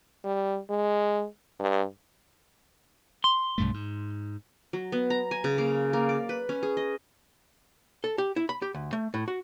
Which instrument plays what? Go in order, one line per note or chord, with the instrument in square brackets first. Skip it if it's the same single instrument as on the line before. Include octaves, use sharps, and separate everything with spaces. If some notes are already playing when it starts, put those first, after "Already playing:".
[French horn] G3
G#3
G2
[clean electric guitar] C6
[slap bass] B1 G2 A3
G#2
[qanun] F#3
B3
A#5
G#5
C#3
A#3
A#3
D5
B4
C#4
G#4
D#5
[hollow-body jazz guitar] A4
G4
E4
B5
G4
D2
A3
A2
F#4